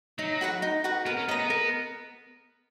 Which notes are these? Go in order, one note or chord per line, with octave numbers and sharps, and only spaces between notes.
F#3 D#4
F#4 B4 F#5
D#4
F#4 B4 F#5
B3 A#4
C#4
B3 D#5 A#5
B3
A#4